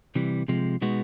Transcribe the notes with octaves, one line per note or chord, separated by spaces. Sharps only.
C3 E3 G3
C3 F3 G#3
B2 G#3 B3 D#4 F#4